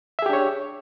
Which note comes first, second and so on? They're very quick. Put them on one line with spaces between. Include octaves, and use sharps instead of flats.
E5 G#4 G4 D4 C#5